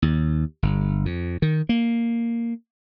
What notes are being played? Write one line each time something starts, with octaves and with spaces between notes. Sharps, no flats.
D#2
G1
F2
D#3
A#3